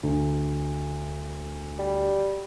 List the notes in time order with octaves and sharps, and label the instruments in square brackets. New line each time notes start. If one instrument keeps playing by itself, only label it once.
[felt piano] D2
[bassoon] G3